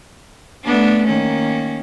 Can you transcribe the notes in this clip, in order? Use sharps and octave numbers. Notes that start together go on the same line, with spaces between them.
A3 B3 D4
D#3 A#3 C#4